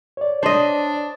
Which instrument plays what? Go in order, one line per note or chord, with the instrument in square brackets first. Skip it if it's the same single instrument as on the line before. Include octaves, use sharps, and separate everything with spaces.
[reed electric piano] C#5 D5
[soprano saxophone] D4 [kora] C5 D#5